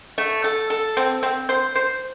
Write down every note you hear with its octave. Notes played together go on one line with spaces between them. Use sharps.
A3
A4
A4
C4
C4
C5
C5